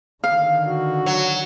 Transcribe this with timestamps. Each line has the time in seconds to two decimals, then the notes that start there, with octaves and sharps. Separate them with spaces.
0.24 D3 D#3 F5
0.67 F#4
1.06 F#3